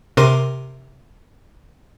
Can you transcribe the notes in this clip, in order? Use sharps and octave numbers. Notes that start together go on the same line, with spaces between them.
C3 A#4 C6 D6 D#7